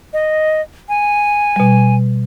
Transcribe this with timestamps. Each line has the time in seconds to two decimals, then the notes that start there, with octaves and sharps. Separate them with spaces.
0.13 D#5
0.89 G#5
1.56 B2 G3